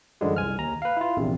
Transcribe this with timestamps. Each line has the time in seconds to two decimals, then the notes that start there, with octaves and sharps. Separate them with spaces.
0.21 F#2 D3 E3 F3 G3 G#3
0.36 C2 G#5 F6
0.58 D#2 A#5
0.82 B4 F5
0.97 E4 F4
1.17 A#1 E2 C3